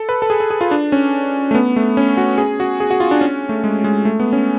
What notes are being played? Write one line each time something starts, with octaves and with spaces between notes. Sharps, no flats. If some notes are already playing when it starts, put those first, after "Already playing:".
Already playing: A4
B4
A4
G#4
A4
G#4
F4
D4
C#4
A3
B3
A3
C#4
F#4
G#4
F#4
G#4
F#4
F4
D4
C#4
A3
G#3
G#3
A3
B3
C#4